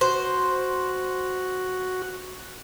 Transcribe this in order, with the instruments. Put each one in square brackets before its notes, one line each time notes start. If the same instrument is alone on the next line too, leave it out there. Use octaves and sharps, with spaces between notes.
[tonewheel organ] F#4 [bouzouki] C5